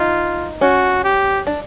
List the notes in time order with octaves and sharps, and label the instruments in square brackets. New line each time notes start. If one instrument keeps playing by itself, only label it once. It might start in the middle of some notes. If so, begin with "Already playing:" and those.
Already playing: [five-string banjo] D#4 [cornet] F4
[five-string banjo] C#4 [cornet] F#4
[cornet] G4
[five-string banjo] D4